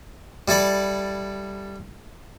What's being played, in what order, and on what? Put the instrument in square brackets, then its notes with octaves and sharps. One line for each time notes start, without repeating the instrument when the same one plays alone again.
[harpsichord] G3 E4 A4 D5